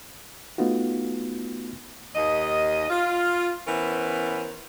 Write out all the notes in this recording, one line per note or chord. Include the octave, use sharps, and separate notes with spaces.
A3 B3 D#4 F4 F#4
D#2 D#5
F4
E3 B3 C#4 A#4 C5